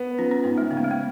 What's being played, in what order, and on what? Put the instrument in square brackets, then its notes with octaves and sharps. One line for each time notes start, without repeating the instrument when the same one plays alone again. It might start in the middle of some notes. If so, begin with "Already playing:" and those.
Already playing: [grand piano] B3
[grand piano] F3 [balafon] C#4
[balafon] C#4
[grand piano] G#2 [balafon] B3
[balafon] G#3
[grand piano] C#3 [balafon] B3
[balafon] A#3
G#3
A#3